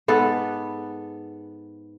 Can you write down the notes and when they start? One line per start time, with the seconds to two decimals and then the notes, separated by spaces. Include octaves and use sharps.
0.08 G#2 B3 A4